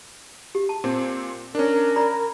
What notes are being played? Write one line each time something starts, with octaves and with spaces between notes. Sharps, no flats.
G4
A5
A#2 C4
C#4 D4 A#4
D5 A#5 B5